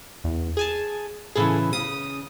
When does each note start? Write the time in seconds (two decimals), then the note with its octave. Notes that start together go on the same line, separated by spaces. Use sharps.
0.24 E2
0.57 G#4 G#5 A5
1.35 A2 C#3 E3 G#4 A4
1.73 C#3 D#6